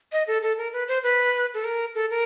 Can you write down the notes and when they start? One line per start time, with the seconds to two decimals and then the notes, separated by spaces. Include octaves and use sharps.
0.12 D#5
0.27 A4
0.42 A4
0.57 A#4
0.73 B4
0.88 C5
1.03 B4
1.54 A4
1.64 A#4
1.95 A4
2.10 A#4